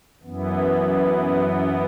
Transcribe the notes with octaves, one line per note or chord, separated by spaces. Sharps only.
F#2 E3 B3